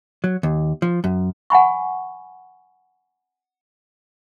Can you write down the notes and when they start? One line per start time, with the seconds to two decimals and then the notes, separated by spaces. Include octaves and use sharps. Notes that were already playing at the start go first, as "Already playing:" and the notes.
0.24 F#3
0.43 D#2
0.82 F3
1.04 F#2
1.50 F#5 G#5 B5 C#6